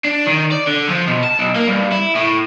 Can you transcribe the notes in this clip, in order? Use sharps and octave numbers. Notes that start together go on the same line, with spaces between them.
D4
D#3
D5
D3
F3
B2
A5
B1
A#3
G2
E4
A2